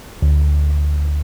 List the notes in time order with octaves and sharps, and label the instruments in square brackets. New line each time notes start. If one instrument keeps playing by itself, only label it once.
[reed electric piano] D2